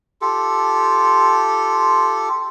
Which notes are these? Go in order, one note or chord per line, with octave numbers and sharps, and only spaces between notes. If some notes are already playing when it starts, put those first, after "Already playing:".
F4 G4 A4